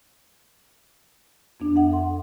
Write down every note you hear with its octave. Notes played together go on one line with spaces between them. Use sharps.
F2 B3 D4
F2 E5 F#5
A4 C6